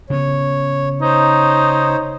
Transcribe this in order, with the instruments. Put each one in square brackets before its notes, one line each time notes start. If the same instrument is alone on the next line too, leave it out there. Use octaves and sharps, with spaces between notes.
[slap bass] C#3 B3 [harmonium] C#5
[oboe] D#4 [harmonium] C5 C#5